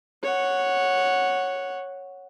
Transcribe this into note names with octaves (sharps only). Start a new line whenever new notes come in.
C#5 F#5